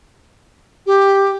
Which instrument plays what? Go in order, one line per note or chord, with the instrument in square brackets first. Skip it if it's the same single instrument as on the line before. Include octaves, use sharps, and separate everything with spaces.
[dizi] G4